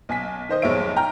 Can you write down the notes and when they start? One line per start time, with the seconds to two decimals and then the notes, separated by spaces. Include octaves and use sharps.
0.09 B1 G#5 B6
0.49 D#3 C5 D#5
0.62 F1 B1 G#2 C#5 E5 D7
0.96 G5 A#5 F6